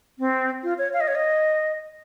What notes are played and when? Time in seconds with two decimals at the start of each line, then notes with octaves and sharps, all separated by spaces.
0.19 C4
0.63 F4
0.78 C#5
0.93 F5
1.01 D#5
1.08 C#5
1.15 D#5